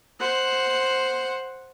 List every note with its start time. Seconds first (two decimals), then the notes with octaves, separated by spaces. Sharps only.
0.19 C5 F#5